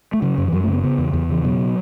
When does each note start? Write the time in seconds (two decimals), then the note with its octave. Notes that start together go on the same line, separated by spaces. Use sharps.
0.13 A3
0.22 C#3 F#3
0.38 F#2
0.48 E3
0.52 F#2 F#3
0.64 A3
0.68 C#3
0.73 B3
0.84 C#3 B3
0.98 E2
1.14 E2
1.29 C#3 E3
1.44 B2 F#3